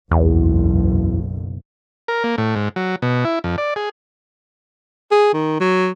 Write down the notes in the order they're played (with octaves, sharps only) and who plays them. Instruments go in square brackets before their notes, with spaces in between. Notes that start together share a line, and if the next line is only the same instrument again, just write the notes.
[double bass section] F#1 B1 [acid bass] E2
[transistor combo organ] A#4
A#3
A2
G#2
F#3
B2
E4
F2
D5
G#4
[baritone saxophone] G#4
D#3
F#3